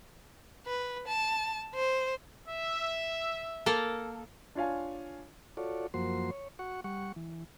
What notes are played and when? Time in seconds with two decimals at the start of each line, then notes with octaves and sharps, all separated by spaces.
0.67 B4
1.08 A5
1.74 C5
2.48 E5
3.66 A#3 A4 A#4
4.55 D4 F4 C#5 F5 G#5
5.57 F4 F#4 A4 C#5 D5
5.94 F#2 F3 A#3 F#4 C5 C6
6.31 C#5
6.59 F#4 F#5 C#6
6.84 G3 F#5 C#6
7.16 E3